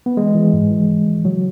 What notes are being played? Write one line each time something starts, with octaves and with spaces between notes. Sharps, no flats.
B3
E3 G#3
E3
G#2
E3
E3
E3
C#3 F#3